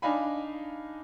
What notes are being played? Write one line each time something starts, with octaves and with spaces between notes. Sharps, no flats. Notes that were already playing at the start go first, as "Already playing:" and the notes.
D4 D#4 F5 G#5 B5